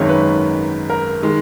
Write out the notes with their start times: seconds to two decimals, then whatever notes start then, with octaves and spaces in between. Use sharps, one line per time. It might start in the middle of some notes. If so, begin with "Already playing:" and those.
Already playing: G#1 F#2 D#3 G#3 C#5
0.09 B4
0.90 A#4
1.22 D#3 G#3